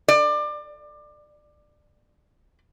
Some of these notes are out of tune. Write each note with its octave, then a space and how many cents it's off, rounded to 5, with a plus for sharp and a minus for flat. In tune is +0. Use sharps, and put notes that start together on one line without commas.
D5 +25